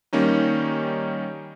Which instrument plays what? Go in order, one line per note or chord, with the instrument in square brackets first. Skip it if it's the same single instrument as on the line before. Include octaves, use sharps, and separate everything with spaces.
[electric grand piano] D#3 G3 A#3 C#4 D#4